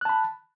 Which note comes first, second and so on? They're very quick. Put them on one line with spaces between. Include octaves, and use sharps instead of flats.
F#6 A5 B5